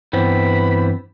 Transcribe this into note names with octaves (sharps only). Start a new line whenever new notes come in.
G2 E3 B3 C4 B5